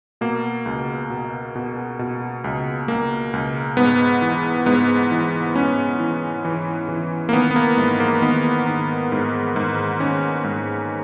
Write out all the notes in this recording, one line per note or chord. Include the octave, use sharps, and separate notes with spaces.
B2 A#3
C#2
B2
B2
B2
C#2
C#2 A#3
C#2
G#2 B3
E3
G#2 B3
E3
G#2 C#4
E3
E3
E3
A#3
D#3 B3
B3
A#3
G#2
A#3
D#3 B3
D#3
G#2
G#2
D#3 C#4
G#2